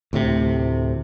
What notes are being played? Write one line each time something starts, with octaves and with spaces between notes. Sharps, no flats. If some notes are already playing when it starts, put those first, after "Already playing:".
D2 A2 C3